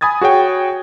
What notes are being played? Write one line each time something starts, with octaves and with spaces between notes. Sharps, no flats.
G#5 B5 D#6 G#6 A6
F#4 G#4 C#5 G5